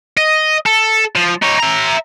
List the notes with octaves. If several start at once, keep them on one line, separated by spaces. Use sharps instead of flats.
D#5
A4
F3
D#4 C#5
E5 A#5